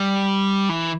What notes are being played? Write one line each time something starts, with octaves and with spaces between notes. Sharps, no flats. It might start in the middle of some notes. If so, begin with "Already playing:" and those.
Already playing: G3
E3